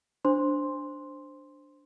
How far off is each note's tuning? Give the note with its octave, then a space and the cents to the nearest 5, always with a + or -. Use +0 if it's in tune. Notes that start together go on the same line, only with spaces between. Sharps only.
D4 +0 C5 +0 C6 +0